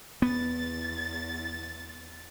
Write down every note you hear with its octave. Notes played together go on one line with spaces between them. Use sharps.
E2 B3 A6